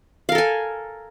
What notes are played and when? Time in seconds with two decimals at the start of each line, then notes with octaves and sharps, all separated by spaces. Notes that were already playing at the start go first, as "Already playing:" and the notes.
0.29 F5
0.32 A#4
0.35 A4
0.38 G#5